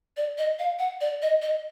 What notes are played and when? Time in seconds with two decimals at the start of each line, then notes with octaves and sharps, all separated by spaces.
0.17 D5
0.38 D#5
0.59 F5
0.79 F#5
1.01 D5
1.22 D#5
1.42 D#5